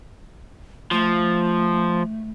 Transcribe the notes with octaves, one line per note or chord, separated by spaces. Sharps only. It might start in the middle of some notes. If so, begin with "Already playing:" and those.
F3 A3